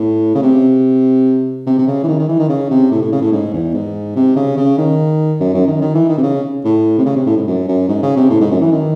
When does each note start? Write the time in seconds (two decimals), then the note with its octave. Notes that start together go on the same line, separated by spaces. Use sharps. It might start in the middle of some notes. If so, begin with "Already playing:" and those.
Already playing: A2
0.35 C#3
0.43 C3
1.67 C3
1.79 C3
1.87 C#3
2.03 E3
2.08 D#3
2.19 D#3
2.29 E3
2.39 D#3
2.49 C#3
2.71 C3
2.92 A2
3.02 A2
3.12 C#3
3.22 A2
3.32 G#2
3.53 E2
3.74 G#2
4.16 C3
4.36 C#3
4.57 C#3
4.78 D#3
5.40 F#2
5.54 F#2
5.67 D#3
5.82 D#3
5.95 E3
6.09 D#3
6.18 C3
6.23 C#3
6.65 A2
6.98 C3
7.06 C#3
7.16 C3
7.27 A2
7.37 G#2
7.47 F#2
7.68 F#2
7.89 G#2
8.03 C#3
8.17 C3
8.30 A2
8.40 G#2
8.51 F#2
8.61 E3
8.72 D#3